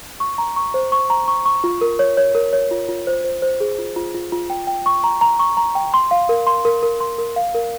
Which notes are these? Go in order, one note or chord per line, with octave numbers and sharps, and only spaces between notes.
C#6
A#5
C#6
C5
C#6
A#5
C#6
C#6
F4
A#4
C#5
C#5
A#4
C#5
F4
F4
C5
C5
C5
G#4
F4
F4
F4
F4
G5
G5
C#6
A#5
A#5
C#6
A#5
G5
C6
F5
A#4
C6
A#4
A#4
C6
A#4
F5
A#4